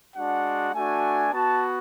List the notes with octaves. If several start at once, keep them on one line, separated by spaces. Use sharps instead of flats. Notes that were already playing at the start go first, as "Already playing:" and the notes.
G#3 D4 F#4 F#5
A3 D4 F#4 G#5
B3 F#4 A5